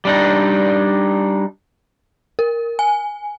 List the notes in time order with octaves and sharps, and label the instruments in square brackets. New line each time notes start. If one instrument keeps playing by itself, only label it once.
[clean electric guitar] G3 D4 D#4
[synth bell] A#4
G#5